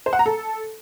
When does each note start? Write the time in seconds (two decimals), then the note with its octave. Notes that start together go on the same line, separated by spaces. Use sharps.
0.06 C5
0.13 F#5
0.19 A#5
0.26 A4